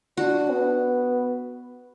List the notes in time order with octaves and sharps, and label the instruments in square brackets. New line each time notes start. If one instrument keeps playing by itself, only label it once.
[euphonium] D4 [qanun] F#4
[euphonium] B3